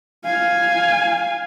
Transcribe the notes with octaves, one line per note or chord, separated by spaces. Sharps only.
F5 G#5